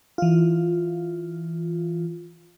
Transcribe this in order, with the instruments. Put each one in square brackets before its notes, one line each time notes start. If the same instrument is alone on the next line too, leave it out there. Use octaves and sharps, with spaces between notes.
[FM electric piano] E3 F4